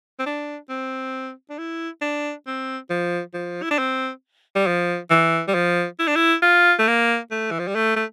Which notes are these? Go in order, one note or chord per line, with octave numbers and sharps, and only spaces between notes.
C4
D4
C4
D4
E4
D4
C4
F3
F3
E4
D4
C4
G3
F3
E3
G3
F3
E4
D4
E4
F4
A3
A#3
A3
E3
F3
G3
A3
A3